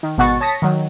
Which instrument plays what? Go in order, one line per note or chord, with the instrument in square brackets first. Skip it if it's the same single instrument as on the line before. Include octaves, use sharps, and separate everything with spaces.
[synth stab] D#3
G#1 B2 F#4 F#5 C#6 A6
C#5 A5 D#6 A#6 B6 C#7
D#3 F#3